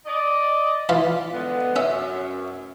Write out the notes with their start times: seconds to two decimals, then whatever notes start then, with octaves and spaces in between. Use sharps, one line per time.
0.06 D5 D#5
0.89 E3 F4 B5
1.32 D3 G#3 B3
1.76 F#2 C#4 E5